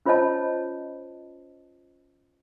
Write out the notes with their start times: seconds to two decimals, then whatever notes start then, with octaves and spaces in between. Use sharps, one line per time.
0.06 C#4 F4 C5 C#5 D#5 A5